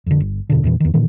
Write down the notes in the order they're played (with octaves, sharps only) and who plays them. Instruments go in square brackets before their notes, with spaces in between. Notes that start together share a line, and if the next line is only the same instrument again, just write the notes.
[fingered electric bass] F2 D3
G1
E2 B2 D3
E2 A#2 E3
E2 D#3
A#2 D#3 E3